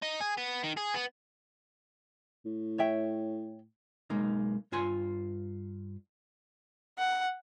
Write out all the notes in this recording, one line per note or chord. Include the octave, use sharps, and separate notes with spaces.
D#4
G#4
B3
D#3
G#4
B3
A2
C#5 E5 G5
B1 G#3 A#3 D#4
G2 F4 G#5 C6
F#5